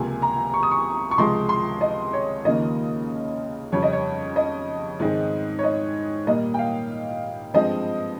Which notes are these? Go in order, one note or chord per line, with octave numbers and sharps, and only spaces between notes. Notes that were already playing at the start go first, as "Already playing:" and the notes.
Already playing: C#2 C3 F3 A#3 G#5
A#5
C#6
D#6
C#6
C#6
C#2 C3 F3 G#3 C6
C6
D#5
C#5
D#2 C#3 F3 A#3 D#5
F2 C#3 G3 C#5
D#5
C#5
D#5
G#2 D#3 G#3 C4
C#5
D#5
A#2 G3 A#3 D#5
G5
F5
G2 F3 G#3 C4 D#5